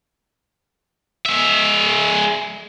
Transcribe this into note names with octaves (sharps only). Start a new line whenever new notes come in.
G#3 E5